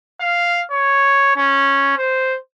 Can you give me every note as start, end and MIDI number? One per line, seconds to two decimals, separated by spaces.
0.20 0.61 77
0.71 1.31 73
1.36 1.94 61
1.98 2.37 72